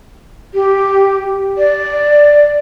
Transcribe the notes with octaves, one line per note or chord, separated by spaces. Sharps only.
G4
D5